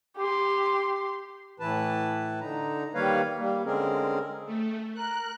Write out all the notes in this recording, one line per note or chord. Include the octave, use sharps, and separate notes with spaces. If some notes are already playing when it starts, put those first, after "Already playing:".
G4 C6
A2 E3 E4 B4 A5
D3 D#4 A#5
D#3 G3 A#3 B4 C#5 F5
G3 A#3
D3 G#3 C4 C#4 G#4 A#4
A3
A#4 F#6